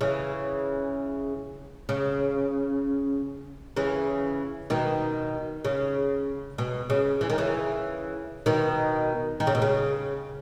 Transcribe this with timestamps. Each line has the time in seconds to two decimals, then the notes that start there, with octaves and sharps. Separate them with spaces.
0.01 C#3 E3
1.89 C#3
3.76 C#3 E3
4.70 B2 D#3
5.65 C#3
6.58 B2
6.90 C#3
7.21 E3
7.30 D#3
7.38 C#3 E3
8.46 B2 D#3
9.40 D#3
9.47 C#3
9.55 B2
9.62 C#3